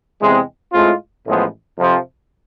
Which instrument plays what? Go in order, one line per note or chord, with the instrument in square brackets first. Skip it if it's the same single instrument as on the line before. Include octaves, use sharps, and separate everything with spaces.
[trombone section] E2 C3 G#3 C4
A2 G#3 C4 F4
A1 A2 F3 G#3 B3
F2 C3 F3